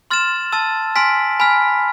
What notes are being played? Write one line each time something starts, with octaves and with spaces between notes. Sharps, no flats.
C6 F6 A6 E7
A5 E6 A6
G#5 C6 F6 B6 D7
G#5 B5 F6 B6